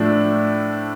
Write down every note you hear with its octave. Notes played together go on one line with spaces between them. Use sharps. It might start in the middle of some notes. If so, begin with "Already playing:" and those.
Already playing: A2 F3 A3 D4